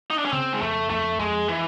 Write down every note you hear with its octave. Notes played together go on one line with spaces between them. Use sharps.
D#4
D4
C#4
C#3 C4
G#3
F2 A3
F2 A3
F2 G#3
E3